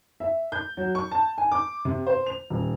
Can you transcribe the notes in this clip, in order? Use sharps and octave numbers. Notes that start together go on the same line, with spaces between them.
E5
G6
F#3
C#6
A5
G#5
D6
C3
C5
F7
D#1